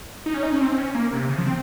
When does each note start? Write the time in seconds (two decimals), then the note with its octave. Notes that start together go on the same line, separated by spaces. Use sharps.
0.26 D#4
0.34 C#4
0.43 D#4
0.52 C#4
0.60 C4
0.78 C#4
0.95 A#3
1.13 C3
1.29 C#3
1.38 F3
1.47 C4